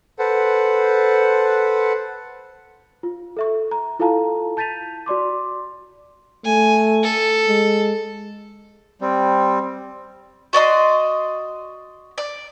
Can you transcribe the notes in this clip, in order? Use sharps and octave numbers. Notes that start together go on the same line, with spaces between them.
A4 B4 C5 F#5
F4
A4 E5 C#6
A#5
E4 F4 A4 F5 A5 A#5
A5 G6 A6 B6 D#7 F7
F#4 D5 C6 D6
A3 G#5
A4
G#3
G3 C4
F#4 D5 D#5 C6
D5